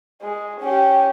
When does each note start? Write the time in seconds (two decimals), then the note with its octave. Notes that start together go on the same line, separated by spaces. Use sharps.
0.22 G#3
0.60 C#4 G4